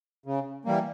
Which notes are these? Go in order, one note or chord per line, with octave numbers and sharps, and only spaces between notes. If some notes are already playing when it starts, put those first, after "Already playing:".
C#3
E3 G3 A#3